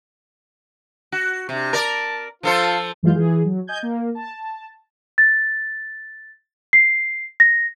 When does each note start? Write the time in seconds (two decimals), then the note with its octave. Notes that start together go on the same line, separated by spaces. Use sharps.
1.12 F#4
1.49 C3 D4
1.73 A#4 D5 A5
2.43 F3 F4 A4 C5
3.03 F#2 E3 G#3 F4 F5 G6
3.16 E3 G#4
3.45 F#3
3.67 D#5 G#5 G6 G#6
3.83 A#3
4.15 A5
5.18 A6
6.73 C7
7.40 A#6